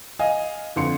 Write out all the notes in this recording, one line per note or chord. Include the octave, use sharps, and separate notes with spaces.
D#5 F5 G#5
F2 D3 F4 C6 C#7